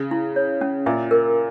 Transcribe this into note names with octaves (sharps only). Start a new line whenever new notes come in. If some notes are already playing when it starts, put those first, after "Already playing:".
Already playing: C#3
E4
C#5
C#4
A#2 E5
A#4